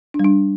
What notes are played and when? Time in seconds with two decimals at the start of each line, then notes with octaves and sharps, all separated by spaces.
0.14 D4
0.19 G3
0.25 D4